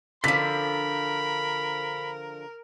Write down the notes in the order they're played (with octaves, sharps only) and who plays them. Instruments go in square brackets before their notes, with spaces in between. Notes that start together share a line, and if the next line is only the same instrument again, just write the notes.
[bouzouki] D3 F3 [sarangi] A#4 [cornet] B5 [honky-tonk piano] B6